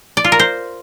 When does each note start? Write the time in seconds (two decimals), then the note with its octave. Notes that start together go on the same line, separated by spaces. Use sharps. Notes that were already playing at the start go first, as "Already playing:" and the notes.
0.17 D5
0.24 F4
0.32 A#4
0.39 C5